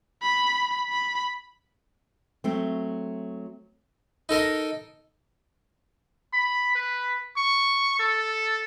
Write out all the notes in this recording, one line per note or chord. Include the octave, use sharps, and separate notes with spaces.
B5
B5
F#3 A3 C4
D#4 A4 A#4 D#5
B5
B4
C#6
A4